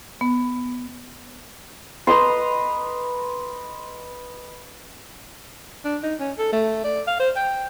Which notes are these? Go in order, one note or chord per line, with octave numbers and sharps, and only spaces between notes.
B3
B4 D#5 A#5 C6
D4
D#4
C#4
A4
A3
D5
F5
C5
G5